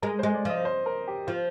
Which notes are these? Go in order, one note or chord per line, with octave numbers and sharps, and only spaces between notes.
G#3 A#4
C5
G#3
D5
F3 D#5
C5
A#4
G4
F3 F4